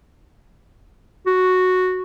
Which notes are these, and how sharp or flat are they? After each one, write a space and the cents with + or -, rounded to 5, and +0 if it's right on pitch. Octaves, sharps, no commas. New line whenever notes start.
F#4 -5